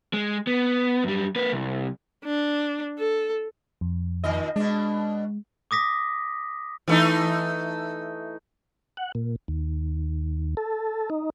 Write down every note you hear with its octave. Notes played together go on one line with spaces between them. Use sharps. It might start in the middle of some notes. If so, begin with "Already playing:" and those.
G#3
B3
F#2 G3
A#3 B4
C2
D4
A4
F2
A#2 D#3 D#5
B2 G#3 D4
D6 D#6 A#6 B6
E3 A3 D#4
F#5
A#2
D#2
A4
D#4